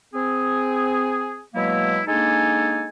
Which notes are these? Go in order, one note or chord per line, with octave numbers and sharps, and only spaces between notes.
C4 G#4
B2 F#3 G#3 A#3 E4
G#3 A#3 D4 D#4 A4 G#5